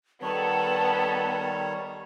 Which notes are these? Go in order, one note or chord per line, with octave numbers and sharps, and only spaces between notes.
D#3 G3 B3 A4 C#5 A5